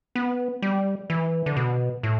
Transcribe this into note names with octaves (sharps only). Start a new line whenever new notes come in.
B3
G3
E3
D3
B2
A2